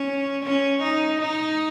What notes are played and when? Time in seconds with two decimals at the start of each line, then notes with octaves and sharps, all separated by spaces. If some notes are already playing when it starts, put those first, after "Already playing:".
Already playing: C#4
0.45 C#4
0.82 D#4
1.21 D#4